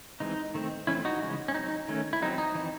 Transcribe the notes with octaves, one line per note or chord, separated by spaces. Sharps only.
E3 G#3 C4 D#4
D#3 A3 C4
E3 A3 C4 C#4 E4
D#4 F#4
C#3 E3 G#3 C#4
C#4
F#3 C4 D#4
D#3 A3 C#4
E4
F#3 C4 D#4
D#4
E3 C4